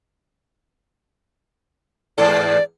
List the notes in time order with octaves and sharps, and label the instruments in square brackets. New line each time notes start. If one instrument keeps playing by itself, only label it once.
[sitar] E2 G#2 A4 [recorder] D5